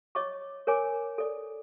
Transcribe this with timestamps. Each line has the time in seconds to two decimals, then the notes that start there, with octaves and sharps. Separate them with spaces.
0.15 C#5 D#5 C#6 D6
0.67 A#4 C#5 G#5 D6
1.18 A4 D5